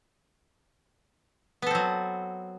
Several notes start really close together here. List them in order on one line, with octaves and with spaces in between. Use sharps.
B3 A4 C4 F#3